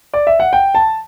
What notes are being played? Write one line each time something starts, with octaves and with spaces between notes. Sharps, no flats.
D5
E5
F#5
G5
A5